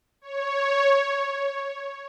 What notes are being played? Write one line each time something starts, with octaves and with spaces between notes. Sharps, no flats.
C#5